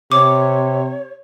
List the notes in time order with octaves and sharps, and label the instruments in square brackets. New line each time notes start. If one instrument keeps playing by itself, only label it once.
[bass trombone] C3 [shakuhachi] C#5 [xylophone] D6